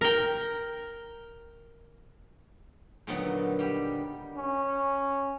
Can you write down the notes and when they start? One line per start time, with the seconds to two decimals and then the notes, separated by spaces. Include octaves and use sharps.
0.01 A#4 G5
3.07 A#2 D3 D#3 F#3 B3 D#4
3.59 G3 G4
4.37 C#4